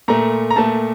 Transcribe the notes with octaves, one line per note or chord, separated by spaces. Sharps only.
A#2 A3 A#5
A#5
A#2 A3 A5